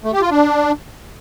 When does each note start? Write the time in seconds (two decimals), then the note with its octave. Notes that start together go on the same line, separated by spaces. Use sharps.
0.04 A3
0.13 G4
0.22 F4
0.30 D4